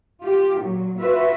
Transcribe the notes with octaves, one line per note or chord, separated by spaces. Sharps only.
F4 G4
A#2 F#3
F4 F#4 B4 E5